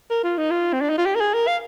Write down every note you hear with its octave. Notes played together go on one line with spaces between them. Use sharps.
A#4
F4
D#4
F4
C4
D4
D#4
F4
G4
A#4
G#4
A#4
F5